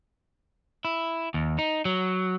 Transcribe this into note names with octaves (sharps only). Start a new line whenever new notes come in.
E4
D#2
D#4
F#3